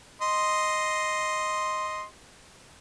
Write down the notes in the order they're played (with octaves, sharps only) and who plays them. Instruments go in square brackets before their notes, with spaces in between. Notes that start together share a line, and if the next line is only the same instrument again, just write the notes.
[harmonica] D#5 C6